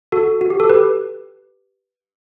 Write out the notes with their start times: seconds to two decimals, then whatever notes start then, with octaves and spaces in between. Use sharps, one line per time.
0.12 F#4 A4
0.41 F#4
0.50 G4
0.60 A4
0.69 G4 B4